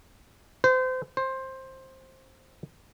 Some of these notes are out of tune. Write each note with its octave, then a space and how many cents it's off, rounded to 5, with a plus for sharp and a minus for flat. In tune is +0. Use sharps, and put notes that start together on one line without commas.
C5 -30
C5 +15